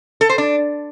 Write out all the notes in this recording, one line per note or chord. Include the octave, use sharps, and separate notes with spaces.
A4
C5
D4